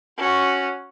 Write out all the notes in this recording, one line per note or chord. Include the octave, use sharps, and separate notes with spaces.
C#4 F#4